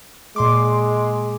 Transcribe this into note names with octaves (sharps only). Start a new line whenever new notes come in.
A#2 G#3 C6 D6